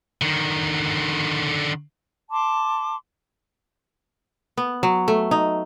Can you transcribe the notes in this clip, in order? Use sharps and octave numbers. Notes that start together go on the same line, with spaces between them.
D3 D#3
A5 C6 D6
B3
F#3
A3
D#4